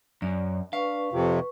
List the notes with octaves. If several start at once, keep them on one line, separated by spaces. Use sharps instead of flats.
F#2 C#4 D5
D4 B4 F5 C#6
F2 C3 F4